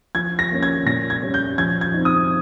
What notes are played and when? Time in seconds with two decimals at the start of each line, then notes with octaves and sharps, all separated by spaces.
0.15 F3 G#6
0.39 A#6
0.51 A#3 C#4
0.63 G#6
0.86 A#2 A#6
1.10 G#6
1.22 G3 C#4
1.34 G6
1.58 F3 G#6
1.81 G#6
1.94 C4 D#4
2.05 D#6